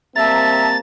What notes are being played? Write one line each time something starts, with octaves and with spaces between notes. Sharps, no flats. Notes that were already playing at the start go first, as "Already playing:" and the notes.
G3 A#3 C4 E5 A5 A#5 A6